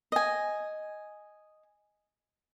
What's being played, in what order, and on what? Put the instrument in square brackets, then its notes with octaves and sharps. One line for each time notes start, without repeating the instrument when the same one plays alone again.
[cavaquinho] D#5 G#5